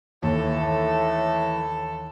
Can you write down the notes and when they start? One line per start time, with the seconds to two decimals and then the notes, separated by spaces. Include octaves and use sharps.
0.23 D#2 A2 E3 A4